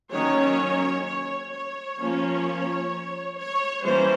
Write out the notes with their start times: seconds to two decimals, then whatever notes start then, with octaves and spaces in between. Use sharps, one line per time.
0.12 D#3 F#3 A#3 C#4 C#5
1.05 C#5
1.52 C#5
1.98 F3 A#3 C#4
3.38 C#5
3.84 E3 G3 A#3 C#4 C5